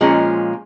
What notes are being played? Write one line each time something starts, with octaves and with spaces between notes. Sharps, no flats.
A#2 F3 G#3 C#4